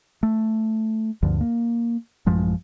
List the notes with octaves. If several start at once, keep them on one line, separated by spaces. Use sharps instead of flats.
A3
D2 G2 D3 F3
A#3
A1 F#2 F3 G#3